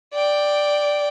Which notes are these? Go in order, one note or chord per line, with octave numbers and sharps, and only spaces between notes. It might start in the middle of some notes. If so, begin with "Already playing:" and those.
D5 G5